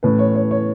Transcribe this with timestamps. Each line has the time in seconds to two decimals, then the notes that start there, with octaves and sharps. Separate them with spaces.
0.03 A2 E3 A3 C#4 B4
0.19 C#5
0.35 C#5
0.51 C#5